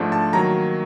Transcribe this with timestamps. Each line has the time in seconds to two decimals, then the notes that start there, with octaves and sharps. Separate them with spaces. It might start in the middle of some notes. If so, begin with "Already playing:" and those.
Already playing: G#2 F3 A3 D4
0.12 A5
0.33 D#3 F#3 A#3 A#5